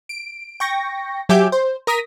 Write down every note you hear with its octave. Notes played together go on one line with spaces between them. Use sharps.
D7
G5 C#6 A#6
F#3 G4 E5 G#5 D6 G6
C5
A#4 D#6 A#6 B6